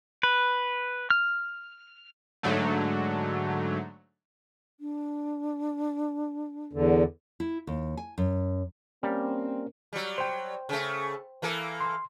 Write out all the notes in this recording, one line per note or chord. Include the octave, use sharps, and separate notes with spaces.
B4
F6
G#2 D3 F#3 A3
D4
E2 D3
E4
D#2
G#5
F#2
G3 A#3 C4 C#4 A#4
F#3 G3
C5 G5
C#3 A3
E3 A#3 A4
C6